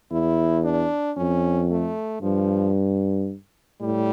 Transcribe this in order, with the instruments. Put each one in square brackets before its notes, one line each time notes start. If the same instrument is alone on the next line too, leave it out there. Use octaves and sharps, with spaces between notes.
[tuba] E2 [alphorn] E4
[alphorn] D4
[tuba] F2 [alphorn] C#4
[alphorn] A3
[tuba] G2 [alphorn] F3
[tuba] A2 [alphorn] G3